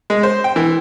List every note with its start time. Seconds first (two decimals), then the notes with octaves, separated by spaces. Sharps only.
0.10 G#3
0.23 C5
0.44 G5
0.56 E3